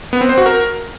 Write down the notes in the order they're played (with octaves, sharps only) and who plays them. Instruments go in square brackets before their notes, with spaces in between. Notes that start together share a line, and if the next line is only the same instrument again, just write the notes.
[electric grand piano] B3
C4
C5
F#4
A#4